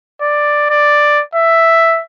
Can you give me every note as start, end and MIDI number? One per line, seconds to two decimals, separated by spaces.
0.21 0.67 74
0.70 1.21 74
1.35 2.02 76